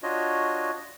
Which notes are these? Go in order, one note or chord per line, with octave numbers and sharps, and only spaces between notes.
D4 F4 F#4 C#5 D#5